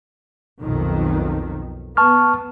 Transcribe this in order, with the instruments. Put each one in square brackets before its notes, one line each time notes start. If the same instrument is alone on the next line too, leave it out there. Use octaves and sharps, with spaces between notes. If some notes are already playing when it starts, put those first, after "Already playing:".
[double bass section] B1 F2 D#3
[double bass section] B3 [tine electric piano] A5 C#6 F6